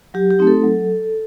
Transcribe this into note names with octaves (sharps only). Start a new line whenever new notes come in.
F#3 G4
G4
A3 C4 D#4
A4
F#3